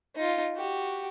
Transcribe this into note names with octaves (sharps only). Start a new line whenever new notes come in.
D#4 F4
F#4 G4